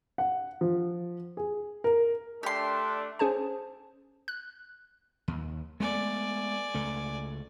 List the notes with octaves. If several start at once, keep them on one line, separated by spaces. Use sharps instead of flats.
F#5
F3
G#4
A#4
A3 D4 G4 C6
C#4 G#4 C5 A5
F#6
D#2
G#3 A3 B3 D5 G#5
C#2 A3